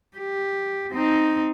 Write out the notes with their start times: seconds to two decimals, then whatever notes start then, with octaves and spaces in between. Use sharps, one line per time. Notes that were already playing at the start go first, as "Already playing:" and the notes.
0.18 G4
0.92 C4 D#4